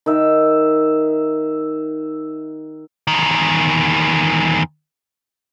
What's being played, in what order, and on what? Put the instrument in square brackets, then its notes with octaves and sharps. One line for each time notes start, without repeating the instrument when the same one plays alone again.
[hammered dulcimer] D#3 E5
[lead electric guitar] E2 D#3